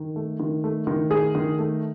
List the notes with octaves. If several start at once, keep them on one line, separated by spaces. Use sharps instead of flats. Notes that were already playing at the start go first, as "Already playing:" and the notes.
Already playing: D#3
A3
D#3
A3
D#3
A3 G#4
D#3
A3